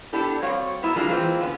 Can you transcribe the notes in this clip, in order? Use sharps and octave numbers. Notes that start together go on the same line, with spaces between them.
B3 D4 E4 G4 A4
G3 C4 F#4 C#5 D5 F5
F#3 A#3 B3 E4 E5
G3 A#3 D4 F4 G#4
E3 G#3 A#3 C4 F4
D3 B3 C#4